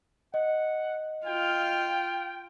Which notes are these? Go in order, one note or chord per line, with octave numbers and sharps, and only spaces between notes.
D#5 F#5
F4 F5 G5